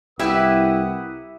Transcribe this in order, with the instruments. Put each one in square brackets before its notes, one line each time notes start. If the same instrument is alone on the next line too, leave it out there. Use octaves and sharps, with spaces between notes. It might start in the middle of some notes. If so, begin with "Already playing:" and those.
[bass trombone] C2 [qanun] E4 G4 B4 [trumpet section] A#4 F#5 D#6 [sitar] E5